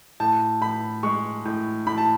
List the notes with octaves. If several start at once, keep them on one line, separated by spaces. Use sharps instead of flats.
A2 A5
A2 B5
G#3 C#6
A2
A2 B5
A5